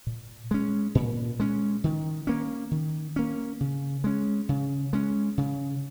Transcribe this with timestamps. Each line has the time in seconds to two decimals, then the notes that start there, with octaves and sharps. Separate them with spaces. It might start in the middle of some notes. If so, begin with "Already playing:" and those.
0.07 A#2
0.51 G#3 C#4
0.95 A#2
1.40 G#3 C#4
1.84 D#3
2.27 A#3 C#4
2.71 D#3
3.16 A#3 C#4
3.60 C#3
4.04 G#3 C#4
4.49 C#3
4.93 G#3 C#4
5.38 C#3